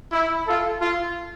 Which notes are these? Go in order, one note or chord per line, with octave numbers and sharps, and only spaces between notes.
E4
F4 A4
F4